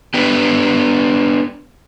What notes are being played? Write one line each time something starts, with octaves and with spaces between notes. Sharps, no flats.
B3 D4 G4